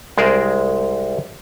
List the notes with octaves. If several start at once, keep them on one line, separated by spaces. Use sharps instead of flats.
C2 G#3 G#4 A#4 C5 D5